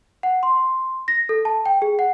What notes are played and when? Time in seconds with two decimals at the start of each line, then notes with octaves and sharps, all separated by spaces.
0.23 F#5
0.43 C6
1.08 A#6
1.29 A4
1.45 A5
1.66 G5
1.82 G#4
1.99 F#5